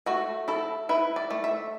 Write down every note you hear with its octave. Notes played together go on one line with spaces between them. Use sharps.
A3 F#4
E4 A4
E4 B4
D5
A3
E5